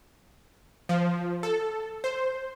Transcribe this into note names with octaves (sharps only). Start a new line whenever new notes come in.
F3
A4
C5